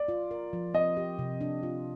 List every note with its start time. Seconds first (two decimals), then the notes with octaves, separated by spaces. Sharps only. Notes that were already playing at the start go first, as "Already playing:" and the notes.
Already playing: D5
0.08 F4
0.31 A#4
0.53 F3
0.74 C4 D#5
0.97 G4
1.19 C3
1.41 D4
1.63 F4